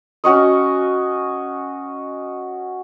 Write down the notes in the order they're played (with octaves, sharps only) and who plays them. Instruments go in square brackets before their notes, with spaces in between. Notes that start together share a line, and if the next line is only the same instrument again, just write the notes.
[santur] C#4 F#4 C#5 D#5